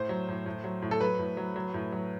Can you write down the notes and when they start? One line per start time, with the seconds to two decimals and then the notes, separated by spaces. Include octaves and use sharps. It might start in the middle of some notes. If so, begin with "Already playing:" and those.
Already playing: A2 C5
0.09 F#3
0.29 A2
0.46 A2
0.64 F#3
0.82 A2
0.91 A4
1.01 F#3 B4
1.19 A2
1.37 F#3
1.56 F#3
1.74 A2
1.92 F#3